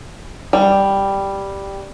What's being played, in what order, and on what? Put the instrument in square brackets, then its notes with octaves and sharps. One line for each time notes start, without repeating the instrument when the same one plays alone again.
[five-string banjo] G3